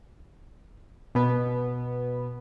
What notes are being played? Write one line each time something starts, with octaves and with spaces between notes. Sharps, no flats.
B2 B3